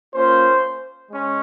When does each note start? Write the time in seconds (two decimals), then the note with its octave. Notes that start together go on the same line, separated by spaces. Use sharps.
0.13 A#3 C#4 F4 C5
1.10 G#3 C#4